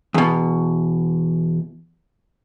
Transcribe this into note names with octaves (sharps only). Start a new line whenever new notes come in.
E2 B2